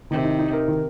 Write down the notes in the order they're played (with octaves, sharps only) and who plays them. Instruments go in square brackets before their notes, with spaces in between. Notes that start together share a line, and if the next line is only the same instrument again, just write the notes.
[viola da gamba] C3 [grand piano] D#3
[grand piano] D#4
D#4
A#4
D#3